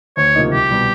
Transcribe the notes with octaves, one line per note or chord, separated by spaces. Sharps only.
D2 C#5
C3 F3 A#3 D#4
C2 G4
B2 G3